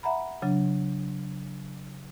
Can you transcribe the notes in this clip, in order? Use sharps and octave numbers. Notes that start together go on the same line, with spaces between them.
E5 F#5 A#5 B5
C#3 F#3 D4